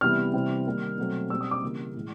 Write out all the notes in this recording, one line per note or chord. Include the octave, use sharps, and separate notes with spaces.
C3 E3 G3 B3 F6
C3 E3 G3 C4
D#3 G3 A#3
B2 F#3 A3 C4
B2 G3 C4 E6
D#6
D6
C#3 E3 G3 A#3
A2 E3 G#3